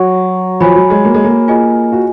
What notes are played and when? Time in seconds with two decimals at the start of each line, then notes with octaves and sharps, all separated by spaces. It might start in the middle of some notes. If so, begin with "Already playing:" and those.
Already playing: F#3 F#4 C#5 F#5 C#6
0.60 F3 F#4 C#5 G#5 B5
0.76 F#3
0.90 G#3
1.05 A#3
1.14 G#3
1.24 A#3
1.48 F4 G#4 D#5 G#5
1.92 F#4